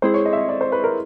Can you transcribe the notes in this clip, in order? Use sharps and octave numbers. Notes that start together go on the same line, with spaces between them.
G#3 C4 E4 G#4 C5
C#5
D#5
E5
D#5
D5
C5
B4
A#4